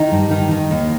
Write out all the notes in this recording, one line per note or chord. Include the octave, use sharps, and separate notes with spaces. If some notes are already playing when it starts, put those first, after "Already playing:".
Already playing: D#3 D#4
G2
D#3
D#3
D#2